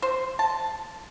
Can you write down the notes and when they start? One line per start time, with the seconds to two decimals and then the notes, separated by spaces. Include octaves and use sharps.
0.02 C5
0.39 A5